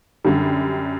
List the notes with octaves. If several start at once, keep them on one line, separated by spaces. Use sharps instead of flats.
F#2 D3 G3